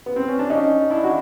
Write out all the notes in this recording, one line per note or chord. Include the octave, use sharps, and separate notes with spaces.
B3
C4
C#4
D4
C#4 D#4
D4 E4
E4 F#4